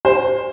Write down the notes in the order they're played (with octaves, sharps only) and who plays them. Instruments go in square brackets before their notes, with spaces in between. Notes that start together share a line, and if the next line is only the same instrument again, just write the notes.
[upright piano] C5